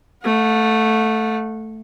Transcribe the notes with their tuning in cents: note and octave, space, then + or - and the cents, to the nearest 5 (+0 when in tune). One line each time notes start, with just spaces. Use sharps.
A3 +0 F#5 -40